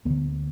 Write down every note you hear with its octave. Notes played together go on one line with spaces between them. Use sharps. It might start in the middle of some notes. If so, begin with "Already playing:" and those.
D2 D3 B3